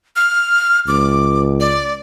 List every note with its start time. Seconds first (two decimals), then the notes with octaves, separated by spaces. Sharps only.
0.16 F6
0.88 C#2 D6
1.60 D5